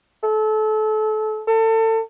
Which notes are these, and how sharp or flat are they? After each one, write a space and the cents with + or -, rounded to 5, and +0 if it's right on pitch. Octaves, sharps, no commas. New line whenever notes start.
A4 -30
A4 +30